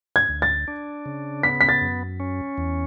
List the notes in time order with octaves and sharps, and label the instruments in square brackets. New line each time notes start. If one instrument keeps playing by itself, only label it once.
[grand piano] G#6
[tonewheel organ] D2
[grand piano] A6
[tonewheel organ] D4
C#3
[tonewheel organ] B3 [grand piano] B6
[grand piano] B6
A6
[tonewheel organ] F#2
C#4
E2